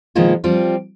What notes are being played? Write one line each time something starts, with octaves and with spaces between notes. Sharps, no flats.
B2 D#3 F3 G#3 A#3 F4
F3 G3 C4 F4